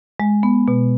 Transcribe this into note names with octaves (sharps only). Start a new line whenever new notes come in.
G#3
B3
B2